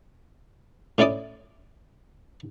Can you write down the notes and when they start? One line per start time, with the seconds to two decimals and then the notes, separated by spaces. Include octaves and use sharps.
0.98 A2 C#4 E4 D5 D6 D#6